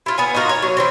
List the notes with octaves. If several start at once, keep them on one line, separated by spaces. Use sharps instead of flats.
E4 F4
B3 F#5 G#5
D#4 F4 F#4 A#4
C#5
F#3
E3 G#3 C4